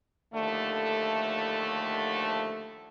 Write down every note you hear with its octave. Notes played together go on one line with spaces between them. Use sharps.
D#2 D3 F3 A3